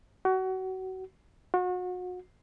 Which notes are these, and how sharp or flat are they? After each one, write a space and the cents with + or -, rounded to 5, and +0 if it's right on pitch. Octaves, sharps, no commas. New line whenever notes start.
F#4 +25
F#4 -35